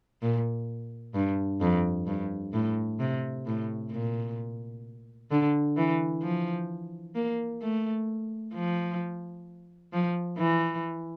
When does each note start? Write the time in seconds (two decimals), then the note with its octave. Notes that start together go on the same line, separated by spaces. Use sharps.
0.22 A#2
1.15 G2
1.61 F2
2.07 G2
2.54 A2
3.00 C3
3.46 A2
3.92 A#2
5.31 D3
5.77 E3
6.23 F3
7.16 A#3
7.62 A3
8.54 F3
9.93 F3
10.38 E3